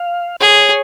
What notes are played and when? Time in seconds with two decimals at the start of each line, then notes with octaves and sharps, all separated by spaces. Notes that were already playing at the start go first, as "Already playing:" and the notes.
Already playing: F5
0.41 G#4 C#5